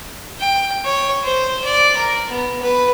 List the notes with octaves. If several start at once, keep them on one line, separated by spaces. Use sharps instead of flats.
G5
C#5
C5
D5
A#4
B3
B4